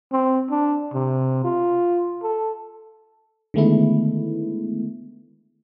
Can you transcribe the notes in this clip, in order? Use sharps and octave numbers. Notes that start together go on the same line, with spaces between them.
C4
D4
C3
F4
A4
D3 D#3 G#3 A3 B3 E4